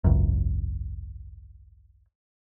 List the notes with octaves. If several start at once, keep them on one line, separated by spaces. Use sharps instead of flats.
G#1 C#2 F#2